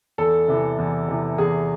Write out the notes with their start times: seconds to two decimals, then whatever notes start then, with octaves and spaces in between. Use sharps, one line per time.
0.18 E2 A4
0.48 C3 E3
0.78 E2
1.08 C3 E3
1.38 E2 G#4